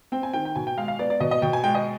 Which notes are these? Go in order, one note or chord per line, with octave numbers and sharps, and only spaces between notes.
C4 G5
G#5
D#3 G5
G5
B2 G#5
G5
G#3 F5
F5
B3 D5
D5
B2 D#5
D#5
B2 G5
G#5
G#3 G5
D#5